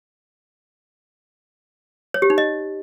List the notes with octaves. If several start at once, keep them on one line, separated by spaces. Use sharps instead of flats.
C#5
G4
D#4
D#5